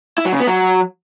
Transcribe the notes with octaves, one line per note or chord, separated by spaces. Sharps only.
E4
F#3
C#3
B3
F#3